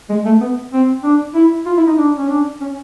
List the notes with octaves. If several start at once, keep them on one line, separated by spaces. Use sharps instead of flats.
G#3
A3
B3
C4
D4
E4
F4
E4
D#4
D4
C#4
D4
C#4